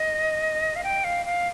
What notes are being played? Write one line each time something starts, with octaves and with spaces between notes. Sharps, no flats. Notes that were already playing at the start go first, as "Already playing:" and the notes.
Already playing: D#5
F5
G5
F5
F5